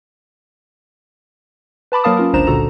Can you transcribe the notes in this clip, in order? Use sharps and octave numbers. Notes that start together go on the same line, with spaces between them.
B4 A5 B5 D6
F#3 A#3 A#4 F5 A5 D#6
C#4 F4 A#4
G1 C#2 D4 C5 A#5 E7
C#2 A#2 D3 F#4 A4 A#5